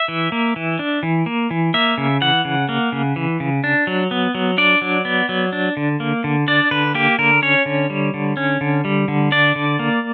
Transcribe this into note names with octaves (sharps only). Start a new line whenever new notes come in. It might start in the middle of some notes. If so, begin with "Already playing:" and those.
Already playing: E5
E3
A#3
E3
D4
E3
A#3
E3
A#3 E5
C#3
E3 F#5
C#3
A#3
C#3
E3
C#3
D4
F#3
B3
F#3
D4 D5
F#3
B3
F#3
D4
D3
A#3
D3
D4 D5
D3 B4
A#3 G4
D3 A#4
C#4 C#5
D3
G3
D3
C#4
D3
G3
D3
D4 D5
D3
A#3